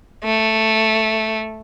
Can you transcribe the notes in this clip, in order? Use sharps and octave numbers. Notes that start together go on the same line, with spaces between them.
A3